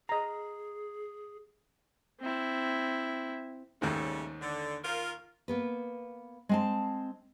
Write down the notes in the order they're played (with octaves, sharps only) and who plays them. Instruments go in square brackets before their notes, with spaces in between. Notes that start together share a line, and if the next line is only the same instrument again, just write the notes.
[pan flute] G#4 [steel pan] D#5 A#5
[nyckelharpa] C4 E4
[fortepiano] D#2 G#2 [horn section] C#3 G3 A3
[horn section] D3
F4 A#4
[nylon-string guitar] A#3 B3 B4
G#3 C4 A5